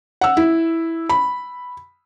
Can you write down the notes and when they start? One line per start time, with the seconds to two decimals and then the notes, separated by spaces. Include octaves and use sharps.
0.21 F#5 E6
0.37 E4
1.10 B5